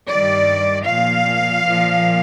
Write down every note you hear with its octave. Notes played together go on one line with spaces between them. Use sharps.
G2 D#3 G3 D5
A#2 F3 F5
A#2 F3